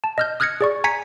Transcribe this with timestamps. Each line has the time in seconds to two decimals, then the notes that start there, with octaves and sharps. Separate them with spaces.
0.04 A5
0.18 D#5 F6 G6
0.40 D#6 F6 F#6 G#6 A#6 C#7
0.61 G#4 D5 C#6
0.84 G#5 A#5 G#6 B6 C#7